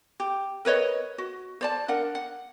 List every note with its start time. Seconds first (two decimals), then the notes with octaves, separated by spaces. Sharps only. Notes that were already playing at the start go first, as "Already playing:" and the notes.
0.20 G4
0.65 A#4 B4 C#5 D#5
1.18 F#4
1.61 C5 D5 A5
1.88 D4 A#4 F#5
2.15 F#5